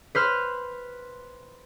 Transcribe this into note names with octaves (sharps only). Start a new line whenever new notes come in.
B4 C5 F6